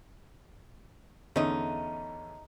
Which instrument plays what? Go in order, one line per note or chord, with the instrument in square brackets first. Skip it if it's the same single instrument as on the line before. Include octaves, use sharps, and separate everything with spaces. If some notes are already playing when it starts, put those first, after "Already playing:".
[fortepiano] E2 D3 C#4 [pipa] A3 D#4